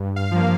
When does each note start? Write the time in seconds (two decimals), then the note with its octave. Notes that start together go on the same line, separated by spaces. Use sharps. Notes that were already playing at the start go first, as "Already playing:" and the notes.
Already playing: G2
0.16 F5
0.31 F3 A#3